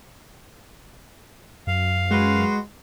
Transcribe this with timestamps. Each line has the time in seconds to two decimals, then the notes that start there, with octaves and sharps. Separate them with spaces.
1.67 F#2 F5
2.11 G#3 F#4 B4 C6